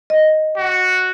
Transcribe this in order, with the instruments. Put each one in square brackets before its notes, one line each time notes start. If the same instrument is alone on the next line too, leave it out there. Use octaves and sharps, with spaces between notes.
[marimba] D#5
[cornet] F#4